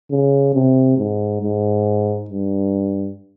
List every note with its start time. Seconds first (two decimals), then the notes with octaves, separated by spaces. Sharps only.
0.11 C#3
0.55 C3
0.98 G#2
1.42 G#2
2.30 G2